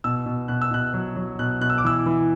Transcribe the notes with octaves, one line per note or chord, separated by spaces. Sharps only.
B2 E6
B2
B2 F#6
E6
B2 F#6
F#3
F#3
B2 F#6
B2 F#6
E6
D6
E3 E6
E3